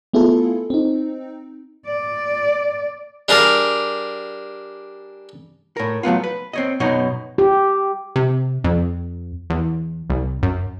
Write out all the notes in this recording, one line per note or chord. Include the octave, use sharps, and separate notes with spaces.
A3 B3 E4 F4 G#4 A4
C4 D#4
D5
G3 D4 G#4 A#4 D5 F5
A2 A#4
F#3 A3 B3 F4
B4
C4 C#5 D#5
F#2 B2 F#3 B3 D#4 D#5
G4
C3
F2
E2
C2
F#2